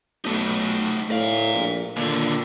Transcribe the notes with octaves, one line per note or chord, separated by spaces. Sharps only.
B1 A3 D#4
A2 D5 F5
A#1
D#2 A#2 D3